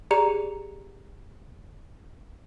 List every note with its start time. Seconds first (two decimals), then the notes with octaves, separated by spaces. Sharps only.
0.11 G4 G#4 D5 A#5 C#7 F7